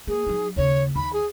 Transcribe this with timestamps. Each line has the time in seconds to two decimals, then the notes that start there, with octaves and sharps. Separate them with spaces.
0.07 A#3 G#4
0.27 F#3 D#4
0.56 D#2 C#3 C#5
0.96 D#2 B5
1.13 G#4